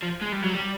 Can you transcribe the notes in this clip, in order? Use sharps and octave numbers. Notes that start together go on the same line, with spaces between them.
F3
G#3
G3
F#3
G3